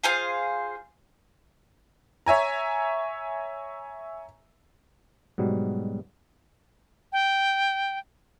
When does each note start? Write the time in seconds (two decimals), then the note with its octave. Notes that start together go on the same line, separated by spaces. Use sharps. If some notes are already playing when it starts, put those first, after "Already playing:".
0.03 F4 G#4 C5 F5
2.26 C#5 E5 G#5 A#5
5.38 G#2 B2 F#3 G3
7.13 G5